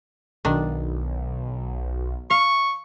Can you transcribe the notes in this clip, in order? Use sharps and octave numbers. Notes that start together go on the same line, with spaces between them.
B1 D#3 D4
F5 C#6